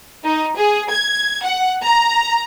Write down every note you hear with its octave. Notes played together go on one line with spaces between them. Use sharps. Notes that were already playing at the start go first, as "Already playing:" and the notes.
D#4
G#4
G#6
F#5
A#5